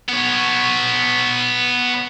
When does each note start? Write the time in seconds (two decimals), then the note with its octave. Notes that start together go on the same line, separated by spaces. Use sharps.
0.09 B3 C#5